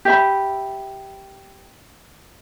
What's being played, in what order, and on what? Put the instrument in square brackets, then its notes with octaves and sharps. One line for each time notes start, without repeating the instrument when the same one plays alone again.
[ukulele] G4 E5 B5